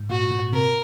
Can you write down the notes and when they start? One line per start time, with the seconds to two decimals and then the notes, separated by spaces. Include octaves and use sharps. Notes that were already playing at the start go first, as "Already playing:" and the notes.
Already playing: G#2
0.10 A#2 F#4
0.31 A#2
0.53 C3 A#4